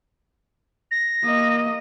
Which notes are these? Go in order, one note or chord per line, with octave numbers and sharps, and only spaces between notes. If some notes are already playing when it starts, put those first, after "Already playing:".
A#6
A#3 D#5